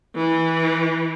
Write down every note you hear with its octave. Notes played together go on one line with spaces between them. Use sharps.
E3